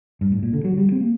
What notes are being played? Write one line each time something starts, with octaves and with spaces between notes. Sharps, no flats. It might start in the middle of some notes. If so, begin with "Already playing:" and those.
G2
A2
A#2
D3
F#3
G3
C4
A#3